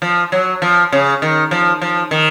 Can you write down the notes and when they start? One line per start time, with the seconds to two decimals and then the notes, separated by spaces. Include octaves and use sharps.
0.02 F3
0.32 F#3
0.62 F3
0.92 C#3
1.22 D#3
1.51 F3
1.81 F3
2.11 D#3